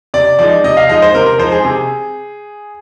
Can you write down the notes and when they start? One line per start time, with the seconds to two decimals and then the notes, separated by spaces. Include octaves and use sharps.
0.14 C3 D5
0.39 F3 G#3 D#4 D5
0.64 C3 D#5
0.77 F5
0.89 F3 G#3 D#4 D#5
1.02 C5
1.15 C3 A#4
1.26 A#4
1.39 F3 G#3 D#4 C5
1.52 G#4
1.64 C3 G#4